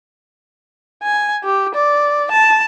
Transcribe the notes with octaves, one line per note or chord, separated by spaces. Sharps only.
G#5
G4
D5
A5